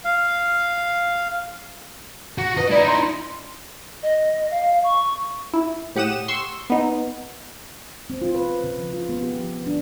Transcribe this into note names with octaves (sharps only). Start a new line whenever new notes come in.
F5
F#4
B4 D#5
D#4 E4 D5
C6
D#5
F5
C#6
E4
A2 G4 F#5 D#6 E7
C6 C#6 E6
B3 D#4
C4
F4
B4
C#3
F3
F4
B3
G4
F3
D4